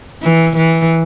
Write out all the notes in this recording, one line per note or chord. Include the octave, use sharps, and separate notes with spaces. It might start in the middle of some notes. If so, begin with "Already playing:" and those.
E3
E3